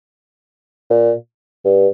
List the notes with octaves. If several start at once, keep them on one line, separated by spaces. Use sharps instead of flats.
A#2
G2